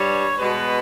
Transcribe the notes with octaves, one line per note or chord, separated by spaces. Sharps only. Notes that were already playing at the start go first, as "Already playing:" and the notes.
Already playing: G2 G3 C#5
B2 G#3 B4